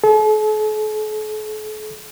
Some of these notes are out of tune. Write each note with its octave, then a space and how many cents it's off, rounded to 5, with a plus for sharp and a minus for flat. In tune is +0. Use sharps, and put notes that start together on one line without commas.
A4 -45